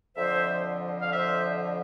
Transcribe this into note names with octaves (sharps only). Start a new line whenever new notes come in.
F2 D3 F3 C5 E5
F5
C5 E5